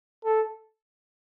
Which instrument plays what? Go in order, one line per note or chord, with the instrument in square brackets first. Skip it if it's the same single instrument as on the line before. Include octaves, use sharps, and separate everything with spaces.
[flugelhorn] A4